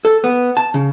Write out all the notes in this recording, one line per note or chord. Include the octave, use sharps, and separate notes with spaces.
A4
B3
A5
C#3